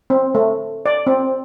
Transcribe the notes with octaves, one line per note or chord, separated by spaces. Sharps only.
C4
A3
D5
C4